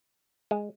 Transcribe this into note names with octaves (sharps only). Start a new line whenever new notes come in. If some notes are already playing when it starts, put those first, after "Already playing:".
G#3